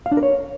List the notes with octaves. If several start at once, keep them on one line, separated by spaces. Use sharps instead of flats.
F5
D4
A#4
C#5